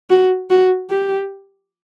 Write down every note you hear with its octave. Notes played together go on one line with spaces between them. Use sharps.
F#4
F#4
G4